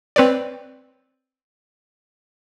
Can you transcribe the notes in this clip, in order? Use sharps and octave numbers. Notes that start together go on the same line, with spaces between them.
C4 B4 C#5 D5